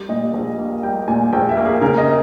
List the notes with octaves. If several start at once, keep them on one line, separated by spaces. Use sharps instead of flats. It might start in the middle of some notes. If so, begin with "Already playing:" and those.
Already playing: G3
A#2 D#5
A#1
A#3
G3 G5
A#2 G#5
A#1 G5
E5
A#3
G#4
C#3 A#4
D#5